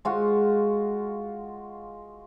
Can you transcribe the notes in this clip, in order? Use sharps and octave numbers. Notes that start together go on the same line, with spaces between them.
G#3 F4 F#4